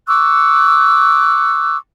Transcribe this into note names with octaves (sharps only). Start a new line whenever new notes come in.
C#6 D6 E6 F#6